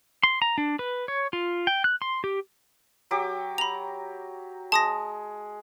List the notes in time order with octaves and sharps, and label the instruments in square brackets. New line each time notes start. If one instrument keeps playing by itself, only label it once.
[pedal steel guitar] C6
A#5
D4
B4
C#5
F4
G5
F#6
C6
G4
[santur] F#3 G4 D6
[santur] A#5 [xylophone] B5 F7
[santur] G#3 [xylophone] A5 D#6 A#6